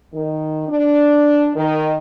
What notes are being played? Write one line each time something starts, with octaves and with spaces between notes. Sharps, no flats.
D#3
D4
D#3